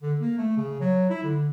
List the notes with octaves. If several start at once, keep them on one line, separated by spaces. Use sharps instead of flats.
D3
A#3
A3
C#3
F#3
E4
D3